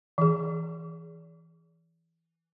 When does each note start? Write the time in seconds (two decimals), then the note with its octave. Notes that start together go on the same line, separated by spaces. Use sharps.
0.18 E3 G#4